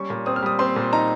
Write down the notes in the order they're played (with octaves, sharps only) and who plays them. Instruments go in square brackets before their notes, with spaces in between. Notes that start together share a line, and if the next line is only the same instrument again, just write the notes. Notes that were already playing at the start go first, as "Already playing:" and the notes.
Already playing: [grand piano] G3 C#4 C#6
A#2
C4 D#6
F6
G3 D#6
C4 C6
A#2
D#4 A#5